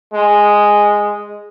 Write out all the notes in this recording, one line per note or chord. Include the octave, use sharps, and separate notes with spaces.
G#3